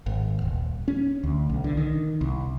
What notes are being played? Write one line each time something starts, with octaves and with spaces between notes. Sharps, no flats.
G#1
D#1
C#4
D2
B1
D3
D#3
C2